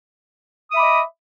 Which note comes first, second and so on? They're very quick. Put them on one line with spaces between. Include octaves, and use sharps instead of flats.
D#6 E5 B5 D6 D#5